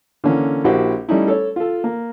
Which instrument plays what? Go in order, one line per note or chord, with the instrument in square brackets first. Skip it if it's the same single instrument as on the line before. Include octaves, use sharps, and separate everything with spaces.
[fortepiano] D3 E3 A#3 C#4
A#1 E4 F#4 G4 C5
G3 A3 C#4 D#4 E4
A4 C#5
F4 A4
A#3